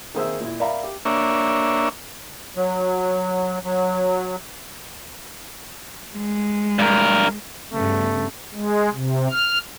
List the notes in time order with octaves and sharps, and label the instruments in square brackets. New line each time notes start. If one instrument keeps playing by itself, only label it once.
[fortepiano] D#3 A#3 G#4 C5 E5 E6
A#2 E4
A#4 D5 E5 F5 A#5 B5
G4
[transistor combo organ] A#3 D4 C#5 E5
[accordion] F#3
F#3
[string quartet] G#3
[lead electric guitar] G2 A#4
[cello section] G2 C#3 B3 [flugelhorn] A3
[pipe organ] G#3
C3
F6